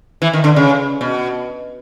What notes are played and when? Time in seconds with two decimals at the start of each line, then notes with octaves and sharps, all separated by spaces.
0.22 E3
0.33 D#3
0.44 D3
0.56 C#3
1.01 B2